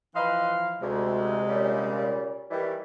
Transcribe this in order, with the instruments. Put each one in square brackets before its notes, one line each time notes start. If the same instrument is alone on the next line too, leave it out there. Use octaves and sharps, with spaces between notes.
[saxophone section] E3 F3 F5 [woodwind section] B4 D#5 C6
[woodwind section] D2 [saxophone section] C3 G#3
[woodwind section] A#2 C#3 G3
D#3 E3 G3